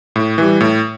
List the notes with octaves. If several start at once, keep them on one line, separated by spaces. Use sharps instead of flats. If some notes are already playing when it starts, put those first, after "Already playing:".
A2
E3 G3
A2